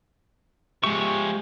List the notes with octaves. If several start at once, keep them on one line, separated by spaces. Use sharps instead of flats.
F3 G#3 G4 E5 C#6